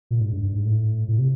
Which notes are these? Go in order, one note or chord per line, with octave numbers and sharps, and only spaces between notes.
A#2
G#2
G2
G2
G#2
A2
A2
C3